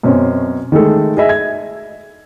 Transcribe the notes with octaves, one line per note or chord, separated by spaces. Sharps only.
F#2 B2 C4 C#4
D#3 G#3 A3 A4
G#4 D#5 E5
G#6